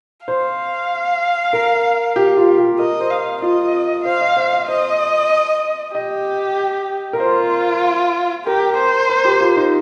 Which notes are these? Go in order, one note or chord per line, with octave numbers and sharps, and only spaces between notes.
C5 F5
A#4
G4
F4
G4
A#4 D#5
C5
F5
F4 D#5
C5 F5
D#5
C5
D#5
C5 D#5
G4 D#5
A#4
F4 C5
G4 A#4
C5
A#4
G4
F4
D#4